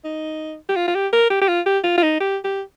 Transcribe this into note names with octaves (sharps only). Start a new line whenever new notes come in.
D#4
G4
F4
F4
G4
A#4
G4
G4
F4
G4
F4
F4
D#4
G4
G4